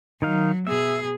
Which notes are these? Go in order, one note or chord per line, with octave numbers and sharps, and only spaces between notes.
D#3 F#3 D#4 F5
B2 G#4 E5